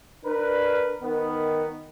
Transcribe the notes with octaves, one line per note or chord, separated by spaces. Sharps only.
D4 A#4 B4
D#3 B3